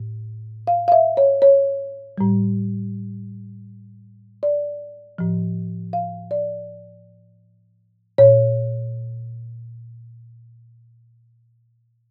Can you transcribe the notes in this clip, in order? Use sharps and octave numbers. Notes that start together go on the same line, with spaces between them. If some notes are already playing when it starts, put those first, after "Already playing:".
Already playing: A2
F5
F5
E5
C#5
C#5
A2 G3
D5
A2 F3
F5
D5
A#2 C#5